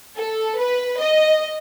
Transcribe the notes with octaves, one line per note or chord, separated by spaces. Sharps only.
A4
B4
D#5